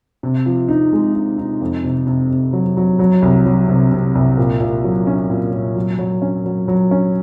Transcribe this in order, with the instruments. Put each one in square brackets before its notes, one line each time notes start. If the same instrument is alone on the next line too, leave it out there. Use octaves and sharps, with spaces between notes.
[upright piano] C3
F3
D#4
G#3
D#4
D#4
F2
C3
C3
C3
F#3
F#3
F#3
C2
F#3
C3
C3
C2
A#2
A#2
F#3
C#4
A#2
A#2
F#3
F#3
C#4
F#3
F#3
C#4